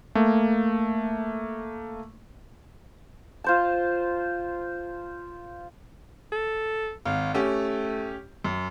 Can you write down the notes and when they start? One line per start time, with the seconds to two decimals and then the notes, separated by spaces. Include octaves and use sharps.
0.15 A3 A#3
3.44 F4 C5 A5
6.32 A4
7.06 G#1 F5
7.35 A3 C#4 G4
8.44 F#2